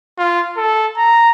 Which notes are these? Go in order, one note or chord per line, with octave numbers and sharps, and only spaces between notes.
F4
A4
A#5